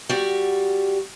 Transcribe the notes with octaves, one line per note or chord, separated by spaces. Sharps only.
G3 F#4